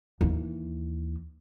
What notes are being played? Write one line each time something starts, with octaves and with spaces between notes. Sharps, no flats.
D#2 E3